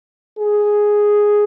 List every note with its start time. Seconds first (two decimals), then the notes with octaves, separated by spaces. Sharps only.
0.39 G#4